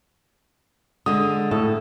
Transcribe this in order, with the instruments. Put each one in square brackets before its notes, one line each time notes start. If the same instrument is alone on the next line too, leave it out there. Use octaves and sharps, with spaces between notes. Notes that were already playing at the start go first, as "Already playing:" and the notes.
[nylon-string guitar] D3 G#3 [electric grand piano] D#6
[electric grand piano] A2 [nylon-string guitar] A4